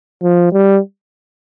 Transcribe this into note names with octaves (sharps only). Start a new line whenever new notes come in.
F3
G3